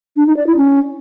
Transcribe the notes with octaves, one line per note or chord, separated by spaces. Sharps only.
D4
D#4
D5
E4
C#4